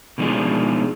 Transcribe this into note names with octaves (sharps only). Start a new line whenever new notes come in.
B2 D#3 F3 G#3 D4 G#4